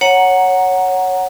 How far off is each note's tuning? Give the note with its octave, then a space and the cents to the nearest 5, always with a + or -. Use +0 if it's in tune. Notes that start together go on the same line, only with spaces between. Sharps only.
C#5 +0 F#5 +0 A#5 +0